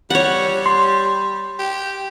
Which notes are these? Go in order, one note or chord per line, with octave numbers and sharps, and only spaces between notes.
G3 C#5 F#5
C6
G4